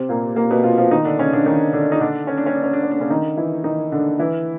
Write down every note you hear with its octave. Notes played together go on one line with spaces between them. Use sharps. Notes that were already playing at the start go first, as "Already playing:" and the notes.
Already playing: C3 C4
A#2 A#3
A#2 A#3
B2 B3
F3 F4
F3 F4
D#3 D#4
D3 D4
C#3 C#4
D3 D4
D#3 D#4
D3 D4
D#4
D3 D4
C#4
D4
C#4
D4
C#4
D4
C#4
D4
C#3 C#4
D#3 D#4
E3 E4
D#3 D#4
D3 D4
E3 E4